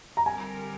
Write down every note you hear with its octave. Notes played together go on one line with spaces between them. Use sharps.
A#5
D3 G3 C4 G4 A#4 G#5